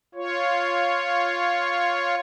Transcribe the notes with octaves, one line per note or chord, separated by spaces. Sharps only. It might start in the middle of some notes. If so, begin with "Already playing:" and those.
F4 C#5